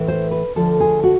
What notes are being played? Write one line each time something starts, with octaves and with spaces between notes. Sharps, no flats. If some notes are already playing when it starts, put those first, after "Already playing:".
Already playing: A2 E3
C5
B4
D2 D3 F3 A4
G#4
F#4